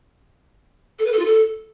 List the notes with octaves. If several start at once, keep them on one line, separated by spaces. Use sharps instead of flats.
A4
B4
A4
F4
A4